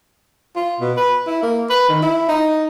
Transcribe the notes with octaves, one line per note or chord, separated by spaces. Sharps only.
F4
B2
B4
E4
A#3
B4
D#3
E4
D#4